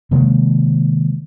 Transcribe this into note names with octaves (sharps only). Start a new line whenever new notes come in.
C3 D#3 G#3 A#3